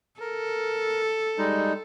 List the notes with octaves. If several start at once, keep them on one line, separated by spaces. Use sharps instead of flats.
A4 A#4
G3 G#3 D#4